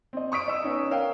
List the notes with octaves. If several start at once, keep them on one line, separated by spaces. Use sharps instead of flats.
C4 D#5
C#6 D#6 B6 D7
D#5 E6
B3 C#4 D#4
A#4 C#5 F5 G5